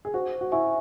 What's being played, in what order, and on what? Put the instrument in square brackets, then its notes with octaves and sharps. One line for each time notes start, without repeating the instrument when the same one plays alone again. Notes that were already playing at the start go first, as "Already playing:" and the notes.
[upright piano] G#4
[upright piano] F#4 [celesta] C5
[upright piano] F#4
[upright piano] E4 [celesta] E5 G#5 C#6